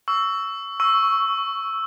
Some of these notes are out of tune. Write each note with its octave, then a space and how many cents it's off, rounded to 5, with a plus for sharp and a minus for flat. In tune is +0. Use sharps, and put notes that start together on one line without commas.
C#6 +20 E6 +0
C#6 +0 E6 +0